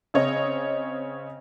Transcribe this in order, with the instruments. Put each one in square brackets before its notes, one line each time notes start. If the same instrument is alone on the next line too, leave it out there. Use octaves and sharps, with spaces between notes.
[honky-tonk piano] C#3 C4 C#5 D#5